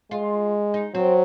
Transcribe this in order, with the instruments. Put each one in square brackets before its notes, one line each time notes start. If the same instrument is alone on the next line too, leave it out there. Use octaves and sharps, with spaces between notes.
[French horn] G#3 [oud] F4
[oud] D#4
[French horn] F#3 [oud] C4